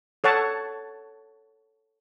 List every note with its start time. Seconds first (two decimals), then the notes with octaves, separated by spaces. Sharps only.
0.24 A4 C#5 F#5 A5